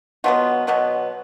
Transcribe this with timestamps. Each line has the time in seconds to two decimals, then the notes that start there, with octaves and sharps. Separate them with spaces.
0.24 B2 F#3 B3 F4
0.67 B2 F#3 B3